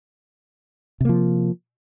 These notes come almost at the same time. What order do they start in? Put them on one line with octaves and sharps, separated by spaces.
C3 A#3 F3